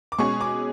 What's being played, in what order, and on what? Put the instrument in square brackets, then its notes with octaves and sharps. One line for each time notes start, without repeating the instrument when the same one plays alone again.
[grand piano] D6
[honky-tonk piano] B2 G#3 C#4 G#4 [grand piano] C#6
[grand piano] D6